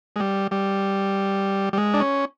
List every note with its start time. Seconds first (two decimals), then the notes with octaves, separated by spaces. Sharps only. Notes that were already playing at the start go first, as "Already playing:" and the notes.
0.16 G#3
0.20 G3
0.51 G3
1.73 G3
1.78 G#3
1.94 D4
2.00 C#4